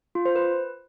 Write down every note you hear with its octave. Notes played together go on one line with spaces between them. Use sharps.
F4
C5
B4